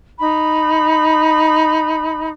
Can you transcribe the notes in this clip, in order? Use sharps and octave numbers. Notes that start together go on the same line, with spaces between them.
D#4 B5